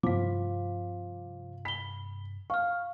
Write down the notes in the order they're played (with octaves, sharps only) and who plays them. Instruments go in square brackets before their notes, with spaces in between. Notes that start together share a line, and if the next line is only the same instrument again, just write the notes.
[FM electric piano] G2 C3 [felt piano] F3 [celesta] F5 D6
[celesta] B5 G7 [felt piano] B6
[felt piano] F5 [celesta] C#6 F6